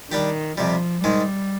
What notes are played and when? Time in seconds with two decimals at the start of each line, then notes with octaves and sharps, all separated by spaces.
0.11 D#3 G3 D4 G4
0.58 F2 C3 F3 G3
1.04 G#2 D#3 G3 G#3